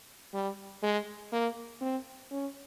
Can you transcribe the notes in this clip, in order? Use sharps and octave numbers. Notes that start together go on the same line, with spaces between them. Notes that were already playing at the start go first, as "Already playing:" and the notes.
G3
G#3
A#3
C4
C#4